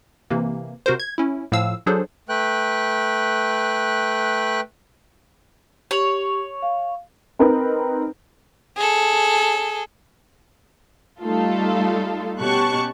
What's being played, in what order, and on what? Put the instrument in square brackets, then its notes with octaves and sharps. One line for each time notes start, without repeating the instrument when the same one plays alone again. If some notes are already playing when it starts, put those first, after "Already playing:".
[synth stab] C3 E3 A#3
C3 F#4 A#4 C5
G#6
C#4 E4
A2 F3 F5 E6
F#3 D4 G#4 A4 C5
[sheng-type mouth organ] A3 B4 G5 F#6
[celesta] G4 F7 F#7 [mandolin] C#5
[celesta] F5
[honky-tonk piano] C4 D#4 A#4 B4
[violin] G#4 A4
[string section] G3 A3 D#4 F4 A4
B2 C#4 G4 A5 C#6 F#6